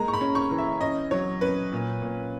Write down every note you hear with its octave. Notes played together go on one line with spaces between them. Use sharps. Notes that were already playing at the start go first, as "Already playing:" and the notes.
Already playing: G#3 A#3 A#5
C#6
B5
C#4
C#6
E3
E5
C#4 D#5
F#3 C#5
C#4 B4
A#2
A#2